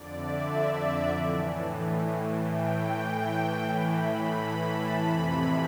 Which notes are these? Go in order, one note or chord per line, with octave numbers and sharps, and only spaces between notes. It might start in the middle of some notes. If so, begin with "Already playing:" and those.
Already playing: F2 D3 D5
E5
A2 E3
A2 E3 G5
A2 E3 B5
B5
A5
F2 C3 E3 B5